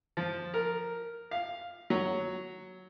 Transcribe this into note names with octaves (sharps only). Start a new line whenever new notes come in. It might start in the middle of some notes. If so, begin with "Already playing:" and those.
F3
A#4
F5
F#3